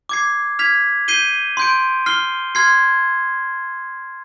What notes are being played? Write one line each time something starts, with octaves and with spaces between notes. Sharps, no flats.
D6 G#6 C7
F6 G#6 B6 F7
G6 C7 D#7 G7
C6 G6 D7
F6 C7 G7
C6 F6 G#6 C7